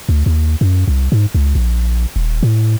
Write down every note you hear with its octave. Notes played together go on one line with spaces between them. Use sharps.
D2
D#2
F#2
C2
G#2
C#2
A#1
D#1
A2